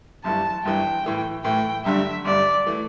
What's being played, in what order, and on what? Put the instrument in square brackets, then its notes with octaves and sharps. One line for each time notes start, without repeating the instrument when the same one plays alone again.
[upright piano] G1 G2 E3 [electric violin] A5
[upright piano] G1 G2 E3 [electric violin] G5
[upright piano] A2 E3 A3
[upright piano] A2 E3 A3 [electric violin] G5
[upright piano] G1 G2 D3 [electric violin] E5
[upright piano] G1 G2 D3 [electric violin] D5
[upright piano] E3 A3